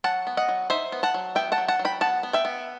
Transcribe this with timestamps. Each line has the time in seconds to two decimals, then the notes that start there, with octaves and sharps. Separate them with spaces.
0.04 F#3 F#5 A5
0.27 B3
0.37 D#5 F#5
0.48 F#3
0.70 D#4 C5 E5
0.92 B3
1.03 F#5 A5
1.14 F#3
1.35 B3 E5 G5
1.52 F#5 A5
1.58 F#3
1.68 F#5 A5
1.79 F#3
1.85 G5 B5
2.01 B3 F#5 A5
2.23 B3
2.33 E5 G5
2.45 B3